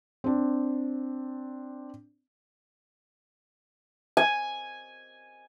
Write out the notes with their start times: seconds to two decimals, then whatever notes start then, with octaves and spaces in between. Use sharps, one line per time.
0.24 C4 D4
4.17 G#5